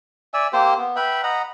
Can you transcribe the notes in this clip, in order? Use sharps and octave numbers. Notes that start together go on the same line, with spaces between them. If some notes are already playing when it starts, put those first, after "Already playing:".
D5 E5 G#5 E6
A#3 C4 G4 C5
B3
B4 E5 G5 B5
D#5 F#5 A#5 B5